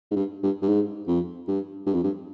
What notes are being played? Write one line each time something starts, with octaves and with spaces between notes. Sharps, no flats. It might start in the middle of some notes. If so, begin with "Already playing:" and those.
G#2
G2
G2
G2
G#2
F2
G2
G2
F2
G2